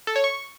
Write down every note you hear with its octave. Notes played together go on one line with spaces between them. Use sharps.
A4
C#5
C#6